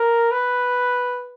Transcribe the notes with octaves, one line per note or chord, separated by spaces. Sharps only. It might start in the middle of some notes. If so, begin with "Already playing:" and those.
Already playing: A#4
B4